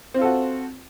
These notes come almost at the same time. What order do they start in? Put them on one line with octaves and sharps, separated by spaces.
C4 F4 A4 F#4